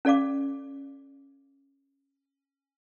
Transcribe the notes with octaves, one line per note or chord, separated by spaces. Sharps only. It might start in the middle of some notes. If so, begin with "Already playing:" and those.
C#4 A4 D5 F5 D6